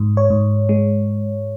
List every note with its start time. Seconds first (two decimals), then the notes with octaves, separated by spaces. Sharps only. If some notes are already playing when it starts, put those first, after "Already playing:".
Already playing: G#2
0.17 C#5
0.30 G#2
0.69 G#3